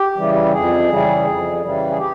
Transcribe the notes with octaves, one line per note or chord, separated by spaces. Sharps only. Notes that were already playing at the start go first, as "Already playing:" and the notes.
Already playing: G4
C#3 E3 G3
F2 G#4
C#3 E3 G3
F2
C#3 E3 G3
G#4
G4